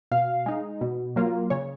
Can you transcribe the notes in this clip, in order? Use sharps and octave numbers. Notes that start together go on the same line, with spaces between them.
B2 F5
G#3 D#4
B2
F#3 A#3 F4
C#3 C#5